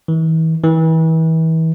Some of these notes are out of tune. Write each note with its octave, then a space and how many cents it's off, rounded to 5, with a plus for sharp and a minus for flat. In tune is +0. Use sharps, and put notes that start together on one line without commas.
E3 -40
E3 -35